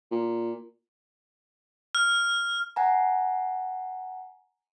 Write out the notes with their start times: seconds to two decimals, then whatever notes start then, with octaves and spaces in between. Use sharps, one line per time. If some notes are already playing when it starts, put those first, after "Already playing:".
0.11 A#2
1.95 F6
2.76 F#5 G#5 A#5